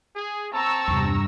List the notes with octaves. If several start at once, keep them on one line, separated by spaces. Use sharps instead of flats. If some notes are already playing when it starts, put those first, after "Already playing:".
G#4
C4 A5 A#5 C#6 E6
E2 G2 C3 A#6